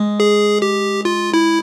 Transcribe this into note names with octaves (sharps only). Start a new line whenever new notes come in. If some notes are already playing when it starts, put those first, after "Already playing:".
Already playing: G#3
G#4
G4
F4
E4